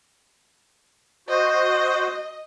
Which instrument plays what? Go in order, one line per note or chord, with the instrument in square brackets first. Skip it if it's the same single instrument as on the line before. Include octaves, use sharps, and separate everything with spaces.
[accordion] F#4 C5 [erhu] D#5